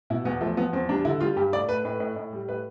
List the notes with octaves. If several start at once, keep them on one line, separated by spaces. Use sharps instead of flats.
B2 E4
E2 B3
F3 A3
F3 B3
E2 C4
G3 D4
D3 E4
G3 F4
G2 G4
A2 D5
A3 B4
A2 B4
A2
A2
G3
A2 B4